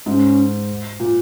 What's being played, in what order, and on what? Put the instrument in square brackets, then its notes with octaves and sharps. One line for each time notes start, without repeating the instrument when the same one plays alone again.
[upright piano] G#2 [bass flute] C#4
[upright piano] A#2